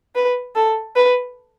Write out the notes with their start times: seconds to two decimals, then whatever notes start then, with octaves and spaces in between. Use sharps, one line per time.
0.16 B4
0.55 A4
0.96 B4